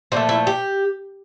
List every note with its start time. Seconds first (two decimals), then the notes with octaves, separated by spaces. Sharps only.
0.12 A#2 F3 A3 C4
0.29 E4
0.47 G4